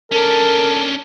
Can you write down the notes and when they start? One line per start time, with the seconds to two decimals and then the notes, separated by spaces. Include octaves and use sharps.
0.12 C#4 D4 A4 A#4 A5